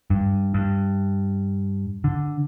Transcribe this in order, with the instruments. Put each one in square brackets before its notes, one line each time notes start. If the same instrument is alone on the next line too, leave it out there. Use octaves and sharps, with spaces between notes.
[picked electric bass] G2
G2
D3